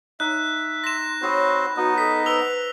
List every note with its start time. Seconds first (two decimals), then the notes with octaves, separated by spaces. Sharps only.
0.20 D#4 E5 F#6
0.84 C6 A#6 E7
1.22 C4 F#4 C5 C#5 G5 B5 D#6
1.77 B3 D#4 F#4 D#5
1.98 A4 B6
2.26 B4 C5 E6 F7